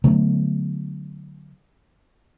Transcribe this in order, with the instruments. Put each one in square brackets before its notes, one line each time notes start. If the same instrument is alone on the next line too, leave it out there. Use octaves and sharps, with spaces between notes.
[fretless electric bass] D3 F#3 A3 B3